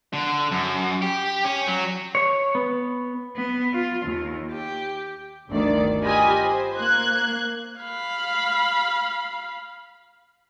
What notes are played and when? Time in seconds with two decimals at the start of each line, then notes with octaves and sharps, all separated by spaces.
0.13 D3
0.51 F#2
1.02 G4
1.45 C#4
1.67 F#3
2.15 C#5
2.55 B3
3.37 B3
3.74 F4
4.06 D#2
4.51 G4
5.48 G1 D2 D#3 D5
6.03 F4 G4 D#5 G#5 B5
6.45 C5
6.78 A#3 F#6 G#6
7.80 F5 B5